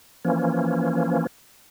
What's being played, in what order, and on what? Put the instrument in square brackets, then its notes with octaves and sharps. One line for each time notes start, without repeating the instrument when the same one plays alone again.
[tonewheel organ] E3 F3 A#3 C#4